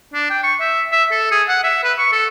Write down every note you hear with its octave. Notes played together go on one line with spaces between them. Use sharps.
D4
G5
C#6
E5
E5
A4
G#4
F#5
E5
B4
C#6
A4